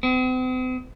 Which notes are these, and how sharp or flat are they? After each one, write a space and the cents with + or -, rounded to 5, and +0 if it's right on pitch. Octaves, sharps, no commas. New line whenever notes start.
C4 -45